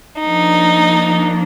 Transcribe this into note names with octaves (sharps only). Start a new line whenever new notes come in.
F3 A#3 D4 D#4